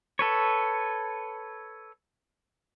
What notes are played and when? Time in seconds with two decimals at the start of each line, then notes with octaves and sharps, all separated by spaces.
0.19 A4 B4 C#5